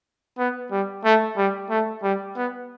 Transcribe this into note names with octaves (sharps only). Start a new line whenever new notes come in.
B3
G3
A3
G3
A3
G3
B3